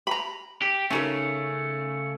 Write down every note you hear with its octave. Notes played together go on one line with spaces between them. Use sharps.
A#5 B5
G4
C#3 A3 C#4 D#4 A#4